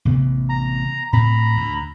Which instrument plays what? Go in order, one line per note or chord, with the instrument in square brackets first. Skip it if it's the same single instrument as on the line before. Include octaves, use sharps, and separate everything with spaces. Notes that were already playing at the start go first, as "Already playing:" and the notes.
[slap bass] A1 C3 B3
[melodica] A#5
[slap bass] A2 C4 [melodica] A#5 B5
[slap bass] D2